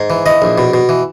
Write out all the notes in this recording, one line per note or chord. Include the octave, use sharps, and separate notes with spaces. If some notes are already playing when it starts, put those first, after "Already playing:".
Already playing: G#2
E3
E3 D#5
A#1
B2
B2
E3